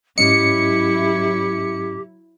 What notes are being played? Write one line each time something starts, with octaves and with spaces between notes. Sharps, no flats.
G#2 F#3 C#4 E4 G4 D#5 C#7